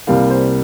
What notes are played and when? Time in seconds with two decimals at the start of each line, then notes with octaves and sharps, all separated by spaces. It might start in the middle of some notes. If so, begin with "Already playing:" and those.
0.07 C2 C3 G3 A#3 F5
0.30 C5